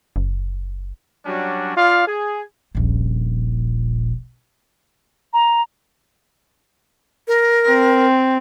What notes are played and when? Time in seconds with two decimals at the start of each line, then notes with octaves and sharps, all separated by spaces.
0.16 F#1
1.26 F#3 G3 C#4 D4 F#4
1.76 F4 D5 F5
2.07 G#4
2.75 D#1 A#1
5.33 A#5
7.28 A#4
7.68 C4